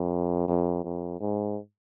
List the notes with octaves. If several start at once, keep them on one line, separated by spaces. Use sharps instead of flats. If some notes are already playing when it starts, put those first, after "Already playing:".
Already playing: F2
F2
F2
G#2